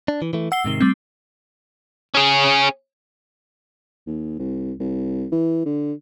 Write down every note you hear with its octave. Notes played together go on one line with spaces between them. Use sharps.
D4
E3
E3 A3
F#5 E6 C7 G7
G#2 C3 D#3
G3 A3 C4
C#4 G#4
D#2
C2
C2
E3
D3